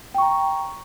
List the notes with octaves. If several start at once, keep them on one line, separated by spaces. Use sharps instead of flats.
G5 A#5 C#6